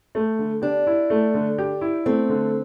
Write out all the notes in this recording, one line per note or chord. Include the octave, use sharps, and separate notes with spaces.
A3
D3
D4 G4
E4
A3
D3
G4
E4
A3 C4
D3